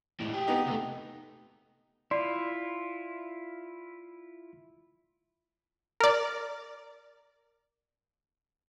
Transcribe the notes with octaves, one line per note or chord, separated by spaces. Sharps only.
A2 G#3
G4 G#4
B3 D#4
C3 A3
E4 F4 D5 C6
A#4 D5